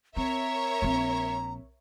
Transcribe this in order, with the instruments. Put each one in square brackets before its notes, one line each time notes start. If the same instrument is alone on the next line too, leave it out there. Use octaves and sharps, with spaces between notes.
[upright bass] C4 [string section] A#4 C#5 E5 [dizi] A#5
[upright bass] A#1 C4